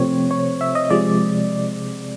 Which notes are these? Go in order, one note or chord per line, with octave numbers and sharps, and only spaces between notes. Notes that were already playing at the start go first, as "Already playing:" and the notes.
Already playing: C3 F3 A3 C4 C#5
C#5
E5
D#5
C3 F3 G#3 D5